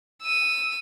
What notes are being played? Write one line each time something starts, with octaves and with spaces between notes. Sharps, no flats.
E6 D#7